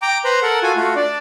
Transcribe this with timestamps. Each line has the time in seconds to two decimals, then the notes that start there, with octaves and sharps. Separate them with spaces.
0.02 G5 A#5 D6
0.25 B4 C5 A#5 B5
0.43 A4 A#4 F#5
0.63 F4 F#4 A4 G#5
0.76 A3 F4 F#4
0.96 D4 D5